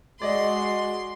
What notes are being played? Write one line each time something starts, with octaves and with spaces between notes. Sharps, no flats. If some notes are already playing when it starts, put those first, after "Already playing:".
G#3 F#4 D5 D#5 C6